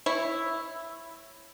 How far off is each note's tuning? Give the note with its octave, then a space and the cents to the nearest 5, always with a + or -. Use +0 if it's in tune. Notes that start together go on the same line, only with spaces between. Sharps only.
E4 +0 C#5 -15